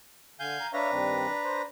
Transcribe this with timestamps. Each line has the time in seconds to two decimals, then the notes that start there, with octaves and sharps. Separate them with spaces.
0.40 D3 F5 G#5 G6
0.61 A#5
0.73 D4 B4 C#5 E5 F5 A#5
0.92 G2 D#3 C4
1.45 C5